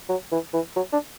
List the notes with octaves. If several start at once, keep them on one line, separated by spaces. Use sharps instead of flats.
F#3
E3
E3
F#3
D4